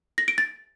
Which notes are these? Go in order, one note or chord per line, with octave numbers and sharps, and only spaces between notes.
A#6
D7
A6